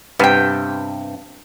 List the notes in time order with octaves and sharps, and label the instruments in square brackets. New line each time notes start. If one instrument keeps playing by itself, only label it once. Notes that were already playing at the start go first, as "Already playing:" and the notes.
[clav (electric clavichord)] G2 C3 [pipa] B3 G5